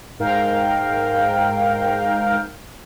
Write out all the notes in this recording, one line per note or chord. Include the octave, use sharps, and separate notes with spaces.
G#2 A#4 F5 G5